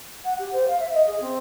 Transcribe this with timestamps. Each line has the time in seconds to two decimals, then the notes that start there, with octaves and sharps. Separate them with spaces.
0.24 F#5
0.39 G4
0.53 C5
0.68 F5
0.79 E5
0.94 D#5
1.07 G#4
1.21 C4